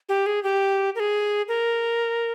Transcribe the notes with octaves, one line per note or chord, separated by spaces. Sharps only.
G4
G#4
G4
A#4
G#4
A#4